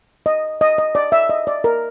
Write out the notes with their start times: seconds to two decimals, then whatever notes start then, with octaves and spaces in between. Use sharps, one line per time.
0.26 D#5
0.61 D#5
0.78 D#5
0.95 D5
1.12 E5
1.29 D#5
1.47 D5
1.64 A#4